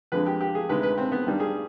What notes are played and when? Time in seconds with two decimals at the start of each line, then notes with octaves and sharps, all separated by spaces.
0.12 F2 D3 G#3 B4
0.26 G4
0.41 G4
0.55 G#4
0.69 D2 C3 D#3 G#3 B4
0.83 B4
0.98 C4
1.12 B3
1.26 G2 D#3 G3
1.40 G#4